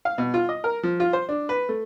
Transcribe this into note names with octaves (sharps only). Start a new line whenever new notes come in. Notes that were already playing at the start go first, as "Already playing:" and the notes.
F5
B2
F4
D#5
A#4
F3
F4
C5
D4
B4
A3